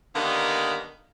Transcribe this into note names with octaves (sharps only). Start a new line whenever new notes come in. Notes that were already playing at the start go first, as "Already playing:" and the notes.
D3 D#3 G3 A#3 B3 D#4